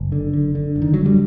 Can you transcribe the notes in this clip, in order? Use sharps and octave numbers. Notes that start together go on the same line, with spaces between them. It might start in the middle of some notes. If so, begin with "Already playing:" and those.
Already playing: F#1
D3
D3
D3
F#1
D#3
D3 F#3
G3